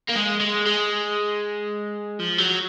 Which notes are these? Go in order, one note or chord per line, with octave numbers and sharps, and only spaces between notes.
A#3
G#3
G#3
G#3
F3
F#3